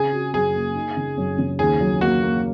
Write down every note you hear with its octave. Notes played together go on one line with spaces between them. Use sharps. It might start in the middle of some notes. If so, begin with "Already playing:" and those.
Already playing: C#3 G#4
F#4
F#2 G#4
A#3
D#4
C#3
F#2
C#3
D#2 G#4
F#3
A#3 F#4
A#3